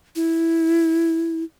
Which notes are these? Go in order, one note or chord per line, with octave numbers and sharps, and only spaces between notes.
E4